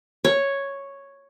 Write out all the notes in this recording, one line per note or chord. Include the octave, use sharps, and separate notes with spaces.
C#5